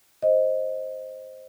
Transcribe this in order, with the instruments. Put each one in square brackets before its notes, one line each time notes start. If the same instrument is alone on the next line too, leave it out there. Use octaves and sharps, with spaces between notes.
[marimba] C5 D#5